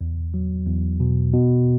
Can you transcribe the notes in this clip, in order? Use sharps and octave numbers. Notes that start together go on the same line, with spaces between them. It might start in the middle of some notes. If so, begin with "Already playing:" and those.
E2
F#3
E2
B2
B2